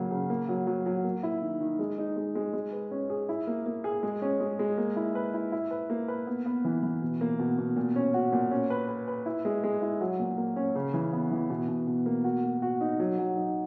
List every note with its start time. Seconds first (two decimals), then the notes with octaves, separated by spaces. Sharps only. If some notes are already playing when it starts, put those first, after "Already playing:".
Already playing: C#3 F#3 A#3
0.11 C#3
0.30 A#3
0.49 F#3
0.67 F#3
0.86 F#3
1.04 A#3
1.23 E4
1.42 D#3
1.61 D#3
1.79 G#3
1.98 D#4
2.16 G#3
2.35 G#3
2.53 G#3
2.72 B4
2.91 C#4
3.10 G#4
3.29 E4
3.47 A#3
3.66 A#3
3.84 G#4
4.03 G#3
4.22 C#4
4.40 G#3
4.59 G#3
4.77 A#3
4.96 E4
5.15 B4
5.34 E4
5.52 E4
5.71 B4
5.90 A#3
6.08 B4
6.27 B3
6.46 B3
6.65 E3
6.83 E3
7.02 B2
7.21 A#3
7.39 B2
7.58 B2
7.76 A#2
7.96 C#4
8.14 F#4
8.32 A#2
8.51 C#4
8.70 B4
8.88 B4
9.08 B4
9.26 E4
9.45 G#3
9.64 G#3
9.82 E4
10.01 F#3
10.19 A#2
10.37 A#3
10.56 C#4
10.75 C#3
10.94 E3
11.13 B3
11.31 E3
11.50 B2
11.68 B2
11.87 B2
12.06 A#3
12.24 F#4
12.43 A#3
12.62 F#4
12.81 D#4
13.00 F#3
13.18 F#3
13.36 D#4